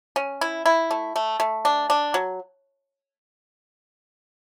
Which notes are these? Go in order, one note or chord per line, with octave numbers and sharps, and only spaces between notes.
C#4
E4
E4
A3
A3
A3
D4
D4
F#3